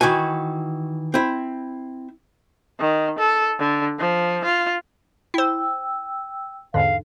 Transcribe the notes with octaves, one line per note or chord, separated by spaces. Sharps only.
D#3 E3 F#4 G#5
C4 E4
D#3
A4
D3
F3
F4
E4 C5 G5 E6
E2 G#2 D3 F5